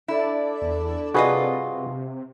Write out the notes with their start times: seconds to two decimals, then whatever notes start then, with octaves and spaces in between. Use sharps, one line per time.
0.08 D4 E4 A4 D5
0.62 E2
1.14 G2 C3 F4 F#4 G#4 B4 D#5